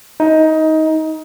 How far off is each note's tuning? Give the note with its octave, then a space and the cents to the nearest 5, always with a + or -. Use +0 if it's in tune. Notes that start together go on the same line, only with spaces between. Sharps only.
D#4 +20